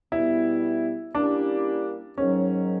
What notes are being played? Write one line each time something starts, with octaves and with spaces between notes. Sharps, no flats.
B2 G3 B3 E4
G3 A#3 C#4 D4 E4 G4
G#2 D#3 F#3 C#4